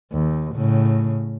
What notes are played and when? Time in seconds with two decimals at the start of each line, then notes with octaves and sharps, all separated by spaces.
0.13 D#2
0.55 A2 C#3